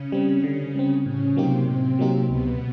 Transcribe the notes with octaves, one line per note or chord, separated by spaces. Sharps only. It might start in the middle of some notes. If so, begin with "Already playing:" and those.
Already playing: C#3 C#4
G3 C4
D3
G3 C4
A2 C#3 C#4
C3 F#3 A#3 C4 D#4 G4
A2 C3 C4
F#3 A#3 D#4 G4
C#2 B2 B3